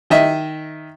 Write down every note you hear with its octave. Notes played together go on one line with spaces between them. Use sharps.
D#3 D#5 E5